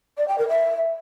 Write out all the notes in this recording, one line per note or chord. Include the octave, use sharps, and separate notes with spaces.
D5
G5
A#4
E5